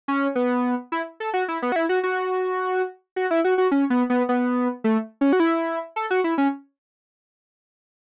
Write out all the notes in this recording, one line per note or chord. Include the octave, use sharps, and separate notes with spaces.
C#4
B3
E4
A4
F#4
E4
B3
F#4
E4
F#4
F#4
F#4
E4
F#4
F#4
C#4
B3
B3
B3
A3
C#4
F#4
E4
A4
F#4
E4
C#4